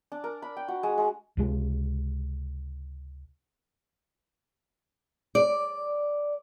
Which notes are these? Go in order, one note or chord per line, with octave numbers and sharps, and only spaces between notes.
D4
A#4
B5
G5
F#4
G#3
G#3
C#2 C3 G#3
D5